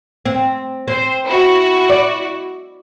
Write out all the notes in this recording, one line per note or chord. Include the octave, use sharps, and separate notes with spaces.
C4
C4 C5
E4 F#4
D5